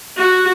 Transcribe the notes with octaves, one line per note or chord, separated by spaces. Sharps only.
F#4